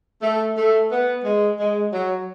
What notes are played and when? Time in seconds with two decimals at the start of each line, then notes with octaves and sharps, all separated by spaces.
0.22 A3
0.56 A3
0.90 B3
1.24 G#3
1.59 G#3
1.92 F#3